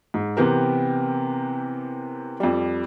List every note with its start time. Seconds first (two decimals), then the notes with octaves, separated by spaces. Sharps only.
0.14 G#2
0.37 C3 E3 B3 C4 G4 A#4
2.40 F2 G3